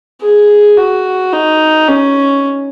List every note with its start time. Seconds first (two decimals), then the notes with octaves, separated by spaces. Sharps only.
0.22 G#4
0.77 F#4
1.33 D#4
1.88 C#4